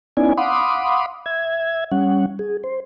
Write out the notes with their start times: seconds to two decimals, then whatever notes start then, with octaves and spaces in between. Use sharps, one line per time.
0.17 B3 C#4 D#4 E4 D5 G#5
0.37 F5 F#5 B5 C6 D6 D#6
1.26 E5 G#6
1.92 G3 C#4 F#5
2.39 G#4
2.64 C5